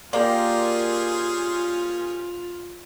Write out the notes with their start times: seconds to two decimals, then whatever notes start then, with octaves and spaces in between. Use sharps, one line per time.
0.13 A#3 C#4 F4 G4 G#4 A#4 C5 D5